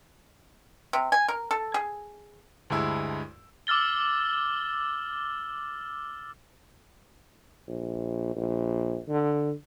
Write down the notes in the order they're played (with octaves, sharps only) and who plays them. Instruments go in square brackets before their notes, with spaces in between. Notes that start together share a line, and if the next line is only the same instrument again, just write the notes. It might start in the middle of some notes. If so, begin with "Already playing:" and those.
[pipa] C3
G#5
A#4
A4
G#4
[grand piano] D2 G2 G#3 E4 E6
[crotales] D6 E6 F6 A6 G7
[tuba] A#1
A#1
D3